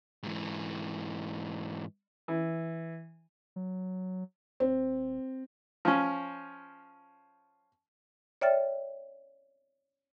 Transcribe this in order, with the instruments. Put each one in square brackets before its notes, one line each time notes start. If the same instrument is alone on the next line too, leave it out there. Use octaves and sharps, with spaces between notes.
[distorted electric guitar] G#2 E3
[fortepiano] E3
[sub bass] F#3
[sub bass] D#1 [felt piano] C4
[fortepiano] F3 C#4
[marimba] C#5 D5 E5 G5 F6 A6